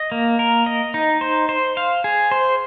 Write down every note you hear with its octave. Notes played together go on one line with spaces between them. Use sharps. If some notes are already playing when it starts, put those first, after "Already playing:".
Already playing: D#5
A#3
A#4
D#5
D#4
C5
C5
F5
G#4
C5